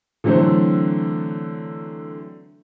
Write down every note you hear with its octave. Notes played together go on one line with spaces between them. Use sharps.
D3 E3 F#3 A3 C4